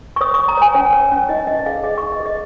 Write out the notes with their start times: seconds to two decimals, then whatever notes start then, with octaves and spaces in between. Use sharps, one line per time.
0.16 C#6
0.21 C#5 D#6
0.34 C#5 C#6
0.48 A#5
0.57 C#5 G#5
0.74 C#4 C#5
0.93 C#5
1.12 C#4
1.29 D#4 D#5
1.47 D#4 D#5
1.59 D#5
1.66 G#4 F5
1.83 G#4 D#5
1.98 C#6
2.02 D#4
2.12 D#5
2.20 G#4
2.26 D#5